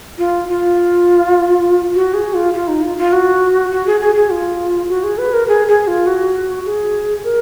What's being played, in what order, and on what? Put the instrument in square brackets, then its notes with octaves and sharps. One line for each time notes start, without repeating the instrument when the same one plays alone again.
[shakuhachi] F4
F4
F#4
G#4
F4
F4
D#4
F4
F4
F#4
F#4
G#4
G#4
G#4
F4
F#4
G#4
B4
A#4
G#4
G#4
F4
F#4
G#4
A#4